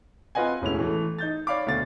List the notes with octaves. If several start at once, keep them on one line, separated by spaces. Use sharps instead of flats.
C4 F4 B4 D#5 F#5 G#5
E1 A2 C#4 E4 F7
E3 A3
D#4 G6 A6
C#5 D5 F5 B5 D6
D2 B2 F5 A6